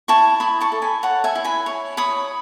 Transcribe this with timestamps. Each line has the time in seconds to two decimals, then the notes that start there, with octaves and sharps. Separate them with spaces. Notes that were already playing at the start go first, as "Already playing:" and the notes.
0.08 E4 A5 C#6
0.40 E4 B5 D#6
0.61 A5 C#6
0.72 A4
0.82 G#5 B5
1.03 C#5 F#5 A5
1.24 E5 G#5
1.35 E4
1.44 G#5 B5
1.66 C#5
1.97 C#5 B5 D#6